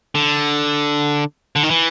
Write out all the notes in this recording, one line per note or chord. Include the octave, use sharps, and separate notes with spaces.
D3
D3
D#3
E3